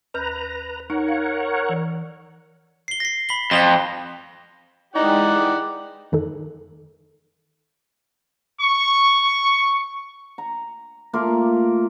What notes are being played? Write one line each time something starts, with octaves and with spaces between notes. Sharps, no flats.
D#2 B4 A#5 F6 G6
D#4 A#4 C#5 F#5
F5
E3
C7 G7
A#6 C7
B5 B6 G7
F2 A#6 F7 G7
E3 G#3 D#4 G4 D5 F#5
F2 D#3 D#4 A4
C#6
A#5
A3 A#3 F4 A#4